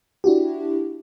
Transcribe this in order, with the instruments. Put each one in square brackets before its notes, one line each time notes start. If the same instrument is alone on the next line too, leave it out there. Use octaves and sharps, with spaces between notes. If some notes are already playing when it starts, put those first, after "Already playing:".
[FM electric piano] D4 E4 F#4 G4